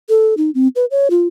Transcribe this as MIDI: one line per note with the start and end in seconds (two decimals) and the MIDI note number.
0.09 0.34 69
0.37 0.50 63
0.55 0.68 60
0.76 0.85 71
0.91 1.08 73
1.10 1.27 65